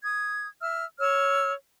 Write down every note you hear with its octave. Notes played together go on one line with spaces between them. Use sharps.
D#6 G#6
E5 E6 F6
C#5 E6 F6